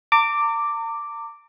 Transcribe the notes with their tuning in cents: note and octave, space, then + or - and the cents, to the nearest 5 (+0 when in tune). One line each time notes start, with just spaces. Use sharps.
A#5 -45 D6 +0